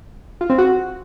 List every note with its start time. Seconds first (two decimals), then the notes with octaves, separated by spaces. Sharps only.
0.41 F4
0.50 C4
0.58 F#4